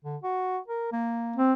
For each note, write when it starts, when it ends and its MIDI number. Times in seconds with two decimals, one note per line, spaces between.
0.04 0.16 50
0.23 0.58 66
0.68 0.87 70
0.92 1.40 58
1.36 1.53 60